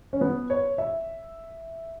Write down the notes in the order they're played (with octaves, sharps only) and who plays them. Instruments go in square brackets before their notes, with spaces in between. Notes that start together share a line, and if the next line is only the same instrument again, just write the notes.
[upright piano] C#4
B3
C#5
E5